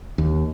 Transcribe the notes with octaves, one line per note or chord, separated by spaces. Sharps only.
D#2